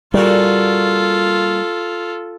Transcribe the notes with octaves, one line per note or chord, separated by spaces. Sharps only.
A#2 C#3 G3 F4 F#4 A4